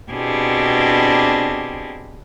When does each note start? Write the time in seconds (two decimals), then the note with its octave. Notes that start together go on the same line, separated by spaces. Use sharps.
0.12 B2 C4 D4 E4 G4 G#4